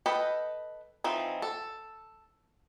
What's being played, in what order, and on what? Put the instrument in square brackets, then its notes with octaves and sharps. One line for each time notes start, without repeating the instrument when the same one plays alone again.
[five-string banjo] A4 B4 D#5 G5
E3 F3 C4 D#4
A4